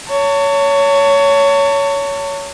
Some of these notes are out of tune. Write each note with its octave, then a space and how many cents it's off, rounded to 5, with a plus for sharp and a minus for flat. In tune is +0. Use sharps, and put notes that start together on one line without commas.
C#5 +20 A5 +40